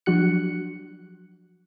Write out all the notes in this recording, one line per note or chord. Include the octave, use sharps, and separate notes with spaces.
F3 F#3 D4 F#4 F#6 C#7